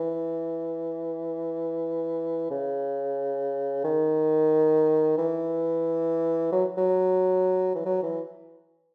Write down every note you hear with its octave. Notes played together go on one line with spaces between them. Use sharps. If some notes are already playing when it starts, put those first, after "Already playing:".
Already playing: E3
C#3
D#3
E3
F#3
F#3
E3
F#3
E3